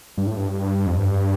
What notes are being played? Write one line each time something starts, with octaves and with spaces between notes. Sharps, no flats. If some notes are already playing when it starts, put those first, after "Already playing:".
G2
A2
G2
F2
G2